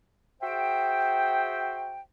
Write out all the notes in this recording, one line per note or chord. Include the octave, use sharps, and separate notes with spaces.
F#4 G#4 C5 E5 G5